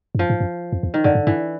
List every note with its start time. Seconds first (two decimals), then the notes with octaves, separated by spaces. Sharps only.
0.15 G2
0.19 F#2 F3
0.30 G#2
0.40 F#2
0.72 F2
0.83 E2
0.94 D#3
1.04 F#2 D3
1.15 G2
1.27 G2 E3